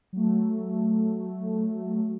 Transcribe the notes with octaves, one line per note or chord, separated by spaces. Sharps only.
F#3 A3